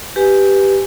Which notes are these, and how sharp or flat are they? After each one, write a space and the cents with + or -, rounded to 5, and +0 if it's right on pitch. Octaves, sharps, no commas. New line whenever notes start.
G4 +0 B4 +0 G#5 +0